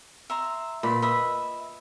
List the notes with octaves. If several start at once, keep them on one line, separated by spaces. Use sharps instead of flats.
E5 A#5 C6
A#2 B4 D5 B5
B4 D#5 E5 B5